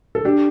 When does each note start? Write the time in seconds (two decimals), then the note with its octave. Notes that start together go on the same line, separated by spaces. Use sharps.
0.15 A4
0.25 D4 G4